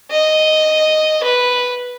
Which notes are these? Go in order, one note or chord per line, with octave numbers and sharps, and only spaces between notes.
D#5
B4